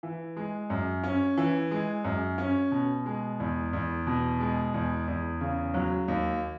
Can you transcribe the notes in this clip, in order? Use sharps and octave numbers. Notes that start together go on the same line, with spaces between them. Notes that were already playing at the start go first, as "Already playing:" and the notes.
E3
G#3
F#2
C#4
E3
G#3
F#2
C#4
B2
G#3
E2
E2
B2
G#3
E2
E2
C#3
F#3
D#2